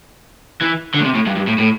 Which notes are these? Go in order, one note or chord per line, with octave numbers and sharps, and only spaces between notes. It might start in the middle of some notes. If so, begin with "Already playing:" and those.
E3
D3
A2
C3
A2
G2
G2
A2
A2